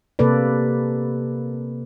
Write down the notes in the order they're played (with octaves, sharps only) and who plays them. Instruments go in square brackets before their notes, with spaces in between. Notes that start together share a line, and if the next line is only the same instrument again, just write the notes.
[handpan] C3 A#3 A4 B4 D5